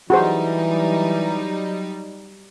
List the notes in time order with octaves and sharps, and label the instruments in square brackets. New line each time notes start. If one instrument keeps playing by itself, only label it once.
[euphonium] E3 [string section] F#3 G3 D#4 [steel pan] F#4 G#4 C5